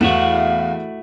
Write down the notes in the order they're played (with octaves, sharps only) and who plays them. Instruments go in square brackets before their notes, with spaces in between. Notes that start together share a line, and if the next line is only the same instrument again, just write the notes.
[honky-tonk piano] E2 [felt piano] E3 [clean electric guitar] A3 E4 F#4 [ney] F5